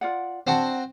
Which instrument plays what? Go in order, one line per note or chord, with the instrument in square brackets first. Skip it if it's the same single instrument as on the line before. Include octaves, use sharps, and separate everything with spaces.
[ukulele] F4 D5 F#5
[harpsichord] C4 F#4 [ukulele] D4 F#5 A5